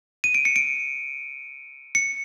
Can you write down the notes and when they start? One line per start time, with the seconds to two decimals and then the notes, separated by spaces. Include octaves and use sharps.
0.24 D#7
0.35 D7
0.45 C#7
0.56 D7
1.95 C#7